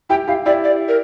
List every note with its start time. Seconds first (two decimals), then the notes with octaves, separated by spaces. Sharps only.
0.10 E4 G4 G5
0.27 E4 G4 F5
0.46 E4 G4 D5
0.64 D5
0.89 A#4